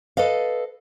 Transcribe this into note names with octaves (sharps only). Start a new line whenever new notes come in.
A4 B4 D#5 F5